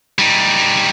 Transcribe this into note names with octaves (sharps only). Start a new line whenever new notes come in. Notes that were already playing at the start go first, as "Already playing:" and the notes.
G3 D#4